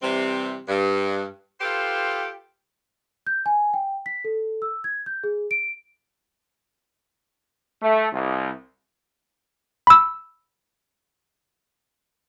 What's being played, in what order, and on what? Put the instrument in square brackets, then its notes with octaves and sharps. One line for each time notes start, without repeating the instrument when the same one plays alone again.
[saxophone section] C3 E3 G3 C4
G2
F4 G4 A4 B4 C5
[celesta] G6
G#5
G5
B6
A4
E6
G#6
G6
G#4
D7
[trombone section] A3
C2
[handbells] B5 E6